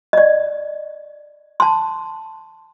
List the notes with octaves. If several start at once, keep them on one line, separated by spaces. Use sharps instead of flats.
D5 D#5
A5 C6